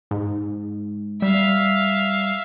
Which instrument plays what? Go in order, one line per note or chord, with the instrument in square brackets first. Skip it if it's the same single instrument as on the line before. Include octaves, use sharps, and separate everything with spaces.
[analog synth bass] G#2
[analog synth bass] G3 [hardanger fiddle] E5 F5